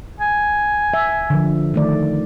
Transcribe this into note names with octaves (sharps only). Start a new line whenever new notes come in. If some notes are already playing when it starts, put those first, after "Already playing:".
G#5
E5
D3 F3
D#3 A3 D5